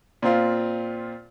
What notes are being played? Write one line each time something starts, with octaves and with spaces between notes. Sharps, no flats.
A#2 C4 F4